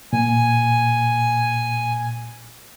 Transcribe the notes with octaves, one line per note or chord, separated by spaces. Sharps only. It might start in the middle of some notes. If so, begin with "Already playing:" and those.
A#2 G#5